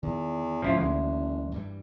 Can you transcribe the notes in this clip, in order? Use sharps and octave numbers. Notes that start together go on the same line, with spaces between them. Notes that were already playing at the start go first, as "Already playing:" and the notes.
E2 D#3
C#2 G#2 C3 F3 E4 F4
F#1 D2 E3 F#3 G#3
G2 E3 G3